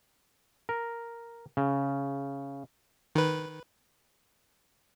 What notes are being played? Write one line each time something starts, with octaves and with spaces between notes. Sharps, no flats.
A#4
C#3
D#3 B4